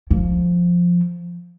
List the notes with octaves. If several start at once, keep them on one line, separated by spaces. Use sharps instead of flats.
F3